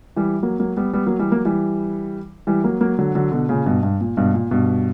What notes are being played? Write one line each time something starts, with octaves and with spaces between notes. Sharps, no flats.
E3 G3
F#3 A#3
F#3 A#3
G3 B3
G3 B3
F#3 A#3
E3 G3
F#3 A#3
E3 G3
E3 G3
F#3 A#3
F#3 A#3
D3 F#3
D3 F#3
B2 D3
A#2 C#3
G2 B2
G2
A#2
G2 B2
A#2
G2 B2